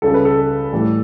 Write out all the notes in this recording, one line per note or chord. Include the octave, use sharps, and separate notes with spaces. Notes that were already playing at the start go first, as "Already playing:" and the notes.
C#2 C#3 G3 A4
B4
A4
A2 E3 G3